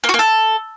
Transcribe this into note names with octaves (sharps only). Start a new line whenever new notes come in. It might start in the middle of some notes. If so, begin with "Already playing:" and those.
A#3
F#4
A#3
A4